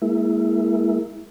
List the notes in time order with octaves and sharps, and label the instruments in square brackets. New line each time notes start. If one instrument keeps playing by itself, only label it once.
[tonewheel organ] G#3 A#3 E4